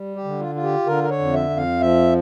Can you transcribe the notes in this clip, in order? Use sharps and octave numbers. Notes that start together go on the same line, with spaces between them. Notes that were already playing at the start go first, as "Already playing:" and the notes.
Already playing: G3
G4
D3
F4
F4
G4
D3 A#4
A#4
C#5
F2
E5
F2
F5
F3 E5